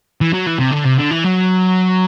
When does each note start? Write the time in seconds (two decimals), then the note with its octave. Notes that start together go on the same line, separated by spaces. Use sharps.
0.21 E3
0.33 F#3
0.47 E3
0.59 C3
0.72 D3
0.85 C3
0.98 D3
1.11 E3
1.24 F#3